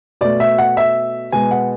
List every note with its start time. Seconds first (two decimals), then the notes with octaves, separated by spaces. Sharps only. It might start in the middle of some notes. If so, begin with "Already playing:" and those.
0.21 B2 A3 D5
0.40 E5
0.58 F#5
0.77 E5
1.32 B2 G#3 B3 G#5
1.51 F#5